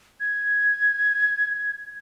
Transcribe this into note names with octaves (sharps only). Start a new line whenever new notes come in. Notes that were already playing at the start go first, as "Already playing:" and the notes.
G#6